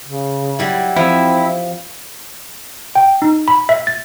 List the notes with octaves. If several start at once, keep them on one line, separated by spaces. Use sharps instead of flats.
C#3
F#3 G3 E4
F3 C4 E4
G5
D#4
B5
E5
A6